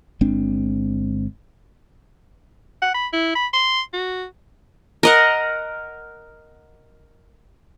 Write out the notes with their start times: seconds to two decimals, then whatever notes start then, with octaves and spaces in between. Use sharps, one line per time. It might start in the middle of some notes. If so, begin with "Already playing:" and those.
0.21 G1 G#3 C4 D4
2.82 F#5
2.94 B5
3.13 E4
3.35 B5
3.53 C6
3.93 F#4
5.03 A#4 D#5 F#5